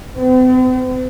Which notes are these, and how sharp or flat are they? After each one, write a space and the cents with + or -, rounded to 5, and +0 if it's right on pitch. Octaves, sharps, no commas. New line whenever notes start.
C4 -45